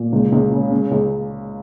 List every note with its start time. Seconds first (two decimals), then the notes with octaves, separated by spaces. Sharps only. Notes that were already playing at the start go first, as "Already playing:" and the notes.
Already playing: A#2
0.12 C#2
0.32 C#2
0.51 C#3
0.71 C#3
0.91 C#2